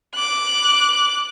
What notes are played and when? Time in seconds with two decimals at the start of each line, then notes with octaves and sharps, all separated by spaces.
0.15 D6 F#6